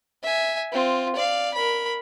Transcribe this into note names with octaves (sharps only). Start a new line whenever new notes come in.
E5 G#5
C4 F4
D5 F5
A#4 B5